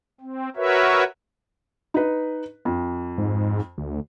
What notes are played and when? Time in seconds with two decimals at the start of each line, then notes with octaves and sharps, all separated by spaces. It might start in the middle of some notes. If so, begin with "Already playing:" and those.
0.20 C4
0.56 F#4 A#4 B4 C#5 E5
1.94 D#4 B4
2.65 F2
3.18 G#2
3.78 D2